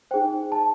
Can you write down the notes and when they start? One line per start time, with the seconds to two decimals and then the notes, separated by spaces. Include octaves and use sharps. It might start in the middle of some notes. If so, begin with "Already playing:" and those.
0.11 D#4 G#4 C5 G5
0.52 A5